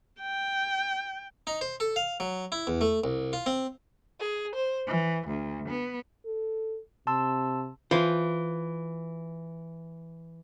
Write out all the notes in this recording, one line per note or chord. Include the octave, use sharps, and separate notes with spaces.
G5
D#4
C5
A4
F5
F#3
E4
E2
A3
C2
F4
C4
G#4
C5
E3
D2
B3
A4
C3 A5 C6 E6
E3 F4 C5